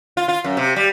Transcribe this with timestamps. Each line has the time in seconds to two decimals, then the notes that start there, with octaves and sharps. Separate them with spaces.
0.17 F4
0.28 F4
0.44 F#2
0.57 C3
0.76 G3